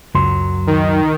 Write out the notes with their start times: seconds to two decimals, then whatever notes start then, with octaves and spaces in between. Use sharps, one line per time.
0.15 C#2 F#2 F#3 C6
0.67 D#3